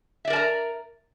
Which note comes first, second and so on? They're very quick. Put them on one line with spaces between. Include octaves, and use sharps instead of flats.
E5 D5 A#4 A5 A#5